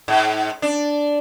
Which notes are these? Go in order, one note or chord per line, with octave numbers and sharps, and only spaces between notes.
G#2
D4